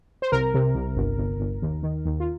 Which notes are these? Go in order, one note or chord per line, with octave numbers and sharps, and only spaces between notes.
C5
C2 A#4
C3
C2
G1
G1
G1
D#2
D#3
D#2
F4